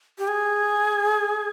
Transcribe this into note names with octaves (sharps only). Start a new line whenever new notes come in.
G4
G#4